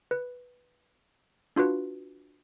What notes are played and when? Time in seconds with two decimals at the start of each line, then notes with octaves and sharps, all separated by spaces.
0.11 B4
1.56 D4 F4 F#4 B4